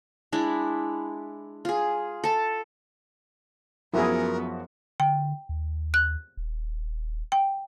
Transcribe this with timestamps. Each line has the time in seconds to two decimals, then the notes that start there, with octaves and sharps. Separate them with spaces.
0.32 G#3 D4 E4
1.65 F4 G#4
2.24 A4 A5
3.94 F#2 F3 B3 E4 F#4 G#4 A#4
5.00 D3 G5
5.49 D#2
5.94 F#6
6.37 D#1
7.32 G5